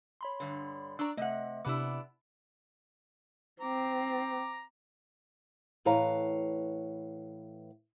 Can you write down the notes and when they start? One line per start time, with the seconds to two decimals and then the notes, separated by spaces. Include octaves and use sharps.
0.21 C#5 B5 C6
0.40 G2 D3
0.99 D4 D5 A#5 C#6 E6
1.17 C3 A3 D#5 E5 F#5
1.65 C3 B3 D4 E4 D6
3.61 C4 A#5 D6
5.85 A2 E3 B4 C#5 F5 A#5